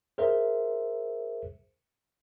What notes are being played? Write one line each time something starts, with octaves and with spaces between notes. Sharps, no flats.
G#4 A#4 C5 E5